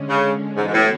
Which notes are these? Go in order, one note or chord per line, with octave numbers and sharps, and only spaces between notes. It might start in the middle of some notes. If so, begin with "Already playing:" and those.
Already playing: D3 G#3 C#4
C#3
G#2 E3 B3 F#4 A4 C#5
G#2
A2